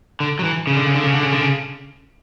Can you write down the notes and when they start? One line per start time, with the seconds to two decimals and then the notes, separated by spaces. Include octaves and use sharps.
0.20 D3
0.39 F#3
0.44 E3
0.67 C#3
0.76 D3
0.85 C#3
0.95 D3
1.04 C#3
1.13 D3
1.23 C#3
1.32 D3
1.41 C#3